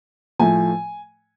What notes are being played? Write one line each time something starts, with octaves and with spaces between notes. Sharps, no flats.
A2 F3 A3 G#5